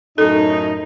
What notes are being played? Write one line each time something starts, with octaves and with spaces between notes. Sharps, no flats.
F#2 A2 D#4 A4